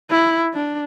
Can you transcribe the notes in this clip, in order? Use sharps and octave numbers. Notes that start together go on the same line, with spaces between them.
E4
D4